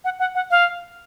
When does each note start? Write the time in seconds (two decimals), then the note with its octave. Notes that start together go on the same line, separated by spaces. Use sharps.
0.05 F#5
0.19 F#5
0.35 F#5
0.51 F5